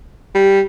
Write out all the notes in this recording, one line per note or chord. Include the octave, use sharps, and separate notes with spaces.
G3